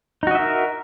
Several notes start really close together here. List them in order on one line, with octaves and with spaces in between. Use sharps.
D#4 F#4 D#5 E5 A#4